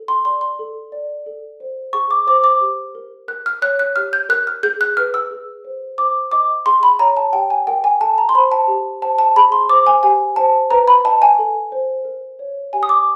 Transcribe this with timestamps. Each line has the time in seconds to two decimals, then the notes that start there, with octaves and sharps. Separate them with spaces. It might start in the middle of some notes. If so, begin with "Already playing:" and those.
Already playing: A4
0.08 C6
0.25 D5 C6
0.41 C6
0.59 A4
0.92 D5
1.26 A4
1.60 C5
1.93 G#4 C#6
2.11 D6
2.27 C5 D6
2.44 D6
2.61 G4
2.95 A#4
3.28 A#4 F#6
3.46 F6
3.62 C#5 F#6
3.79 F#6
3.96 G4 F6
4.13 G6
4.29 A#4 F#6
4.47 F6
4.63 G#4 G6
4.81 F#6
4.97 B4 F6
5.14 E6
5.31 G#4
5.65 C5
5.98 C5 D6
6.32 D#5 D6
6.66 G#4 C6
6.83 B5
6.99 C#5 A#5
7.17 A5
7.33 G4 G5
7.50 G#5
7.67 A#4 G5
7.84 G#5
8.01 A4 A5
8.18 A#5
8.29 C6
8.35 C5 B5
8.52 A5
8.68 G4
9.02 C5 A5
9.19 A5
9.36 G#4 B5
9.52 C6
9.69 C5 D6
9.87 G#5
10.03 G4 G#5
10.36 C5 A5
10.71 B4 A#5
10.88 B5
11.05 D#5 A5
11.22 G#5
11.39 A4
11.72 C5
12.05 A#4
12.39 C#5
12.73 G4 G#5
12.83 D#6
12.89 D6